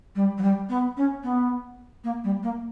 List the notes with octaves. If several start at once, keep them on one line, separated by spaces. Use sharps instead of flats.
G3
F#3
G3
B3
C#4
B3
A#3
G3
A#3